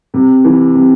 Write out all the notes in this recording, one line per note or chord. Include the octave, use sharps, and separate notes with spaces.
C3
E3
C3